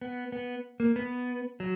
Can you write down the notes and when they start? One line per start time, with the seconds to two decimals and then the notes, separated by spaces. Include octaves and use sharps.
0.01 B3
0.32 B3
0.80 A#3
0.96 B3
1.60 F#3